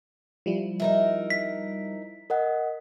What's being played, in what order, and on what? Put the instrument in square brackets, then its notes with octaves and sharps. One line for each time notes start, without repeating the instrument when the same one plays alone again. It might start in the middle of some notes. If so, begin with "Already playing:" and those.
[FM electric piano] F3 G3 E4
[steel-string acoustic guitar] D#4 A#4 E5
[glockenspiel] B6
[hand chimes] A#4 D#5 F#5